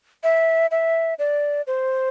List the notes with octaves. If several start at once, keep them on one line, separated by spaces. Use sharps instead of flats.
E5
E5
D5
C5